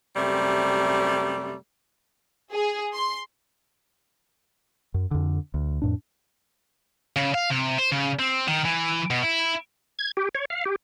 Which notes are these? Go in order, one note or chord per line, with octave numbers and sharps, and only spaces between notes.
F#2 C3 G3 A3
G#4
C6
F#2
F2 D3
D2
F2 A2 D4
C#3
F5
C3
C5
C#3
C4
D#3
E3
B2
E4
G#6
G4
C#5
F5
G4